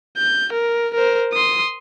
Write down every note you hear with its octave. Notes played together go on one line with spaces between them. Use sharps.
G6
A#4
A#4 C5
C6 D#6